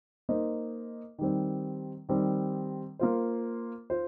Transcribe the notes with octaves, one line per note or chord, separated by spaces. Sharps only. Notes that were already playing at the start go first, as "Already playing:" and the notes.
A#3 D#4 C5 D#5
D#3 G3 C4
D#3 G3 C4
A#3 F4 C5
F4 C5